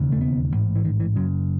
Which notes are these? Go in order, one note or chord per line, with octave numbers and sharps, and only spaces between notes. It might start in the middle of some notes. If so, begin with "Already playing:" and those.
Already playing: E1 D#2 C#3
A3
B3
A1 G#2
E3
D#3
E3
F#1 F#2 C#3 F#3